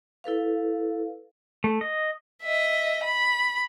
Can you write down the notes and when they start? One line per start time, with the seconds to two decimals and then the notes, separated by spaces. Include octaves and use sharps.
0.24 E4 A4 B4 F5
1.64 A3
1.81 D#5
2.43 D#5 E5
3.03 B5